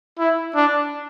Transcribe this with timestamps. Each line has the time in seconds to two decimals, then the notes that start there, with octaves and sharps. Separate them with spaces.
0.19 E4
0.55 D4